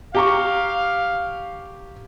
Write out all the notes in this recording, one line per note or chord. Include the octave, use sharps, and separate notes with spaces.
G4 F5 A#5 C#6